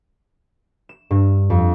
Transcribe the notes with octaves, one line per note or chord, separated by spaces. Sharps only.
E7
G2
F2